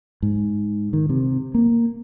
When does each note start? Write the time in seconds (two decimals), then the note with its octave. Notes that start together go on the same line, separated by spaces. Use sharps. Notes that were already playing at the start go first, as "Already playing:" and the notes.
0.22 G#2
0.93 D#3
1.09 C3
1.54 A#3